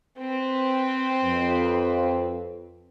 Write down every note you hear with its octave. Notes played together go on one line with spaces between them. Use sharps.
C4 B4
F2